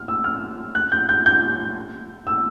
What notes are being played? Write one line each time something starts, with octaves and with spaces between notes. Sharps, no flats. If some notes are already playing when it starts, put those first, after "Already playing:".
Already playing: F6
E6
F6
F#6
G6
G6
G6
E6